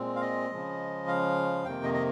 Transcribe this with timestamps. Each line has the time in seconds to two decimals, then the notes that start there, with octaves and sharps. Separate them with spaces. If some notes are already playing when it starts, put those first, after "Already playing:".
Already playing: A#2 G#3 C4
0.16 F5
0.21 D#5
0.50 C#3 F3 G#3
1.08 F5
1.64 F2 C3 D#3 A#3 G5
1.84 D#5
1.94 D#5